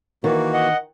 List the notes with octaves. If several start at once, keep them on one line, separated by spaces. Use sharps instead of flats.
D#3 E3 A#3 F#4
D#5 F#5